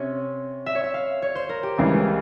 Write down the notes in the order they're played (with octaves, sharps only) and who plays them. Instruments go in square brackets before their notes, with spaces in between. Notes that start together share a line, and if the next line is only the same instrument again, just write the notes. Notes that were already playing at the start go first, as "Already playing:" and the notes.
Already playing: [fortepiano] C3 C#4 [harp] C#5
[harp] E5
C#5
E5
F5
C#5
C5
A#4
G4
[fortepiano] C#2 C#3 E3 G3